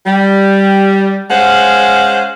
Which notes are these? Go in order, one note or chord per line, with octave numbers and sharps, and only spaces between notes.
G3
G#3 C#4 C5 F5 F#5